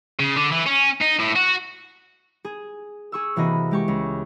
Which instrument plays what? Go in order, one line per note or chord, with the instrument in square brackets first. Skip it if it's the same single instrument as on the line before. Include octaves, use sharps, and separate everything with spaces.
[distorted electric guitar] C#3
D3
E3
C#4
D#4
A2
F#4
[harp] G#4
G#4 C#6 E6
C3 E3 A#3 F#4 D#5 B5
G#3 G4 C#6
C#2